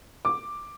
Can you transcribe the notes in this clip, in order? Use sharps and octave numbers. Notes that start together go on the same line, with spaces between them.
D6